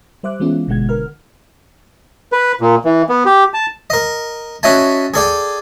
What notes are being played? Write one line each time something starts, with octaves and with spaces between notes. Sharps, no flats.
G3 C5 E5 D6 F#6
E3 G#3 B3 C#4 F4
G1 B2 D3 G#3 F#5 G#6
D3 A#4 B4 F6
B4
A#2
E3
B3
G4
A5
A#4 D#5
C#4 F#4 D#5 E5 G#5 A5
G#4 A4 D5 G5